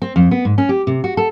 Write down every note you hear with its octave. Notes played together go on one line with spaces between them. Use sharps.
C4
F2
B3
G#2
C#4
G4
C3
F#4
A4